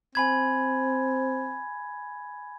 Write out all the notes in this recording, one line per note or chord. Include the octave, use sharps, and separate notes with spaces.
C4 G#5 B5 G#6